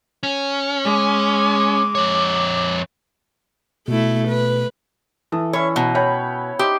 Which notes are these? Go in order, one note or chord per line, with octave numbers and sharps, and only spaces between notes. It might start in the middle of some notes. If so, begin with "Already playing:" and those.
C#4
G#3 D6
F2 C#5
B2 A3 E4
B4
E3 A4 D#6
C#4 E4 C#5
B2 A#5
C#5 G5 B5
D#4 G4 C5 E5